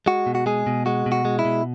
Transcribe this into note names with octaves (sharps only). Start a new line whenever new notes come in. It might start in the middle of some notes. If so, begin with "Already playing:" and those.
G#3 F#4
B2
F#4
G#3 G#4
B2
G#3 F#4
B2
F#4
G#3
E4
B2